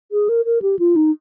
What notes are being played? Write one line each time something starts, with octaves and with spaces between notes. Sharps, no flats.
G#4
A#4
A#4
G4
F4
D#4